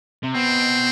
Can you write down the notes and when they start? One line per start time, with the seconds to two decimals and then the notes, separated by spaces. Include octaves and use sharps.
0.23 C3
0.35 B2 C4